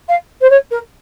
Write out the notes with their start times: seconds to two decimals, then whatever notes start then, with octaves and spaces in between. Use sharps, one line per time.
0.09 F5
0.41 C5
0.50 C#5
0.71 A#4